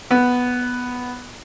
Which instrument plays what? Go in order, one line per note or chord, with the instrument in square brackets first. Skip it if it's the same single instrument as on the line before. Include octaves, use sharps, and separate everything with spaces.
[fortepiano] B3